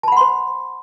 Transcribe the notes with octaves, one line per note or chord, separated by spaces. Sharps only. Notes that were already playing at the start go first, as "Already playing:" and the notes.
C5 F#5 A5 B5 C6